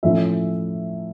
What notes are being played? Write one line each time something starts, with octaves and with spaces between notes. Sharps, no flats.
A2 F3 A3 C#4 E5